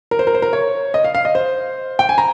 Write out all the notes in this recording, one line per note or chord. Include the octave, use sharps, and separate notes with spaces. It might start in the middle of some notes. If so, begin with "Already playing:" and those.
A#4
C5
A#4
C5
A#4
C#5
D#5
F5
F5
D#5
C5
G5
G#5
A#5